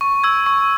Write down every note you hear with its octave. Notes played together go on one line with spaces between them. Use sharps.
C#6
E6 G#6
C#6